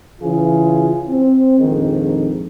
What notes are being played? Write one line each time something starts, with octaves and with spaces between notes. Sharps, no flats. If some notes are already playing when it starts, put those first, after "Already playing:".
C#3 E3 F4 G#4
C4
A#1 F2 G#2 D#3